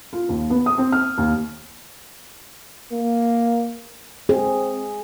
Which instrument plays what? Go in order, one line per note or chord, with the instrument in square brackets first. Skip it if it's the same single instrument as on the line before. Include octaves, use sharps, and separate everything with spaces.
[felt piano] F4
D#2
B3
D#6
C4
F6
D#2
[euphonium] A#3
[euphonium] C4 [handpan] G#4